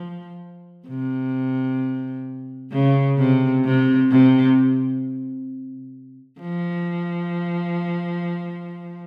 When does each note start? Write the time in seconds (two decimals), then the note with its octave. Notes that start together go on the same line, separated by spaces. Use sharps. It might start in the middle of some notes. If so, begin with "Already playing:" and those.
Already playing: F3
0.88 C3
2.72 C#3
3.18 C3
3.65 C3
4.10 C3
6.41 F3